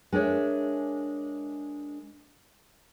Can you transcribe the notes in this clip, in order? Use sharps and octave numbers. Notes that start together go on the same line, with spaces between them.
G#3 D4 A#4 C#5 E5